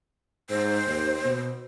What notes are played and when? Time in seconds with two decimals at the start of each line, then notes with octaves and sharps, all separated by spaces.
0.50 G#2 C5
0.86 D#2
1.25 B2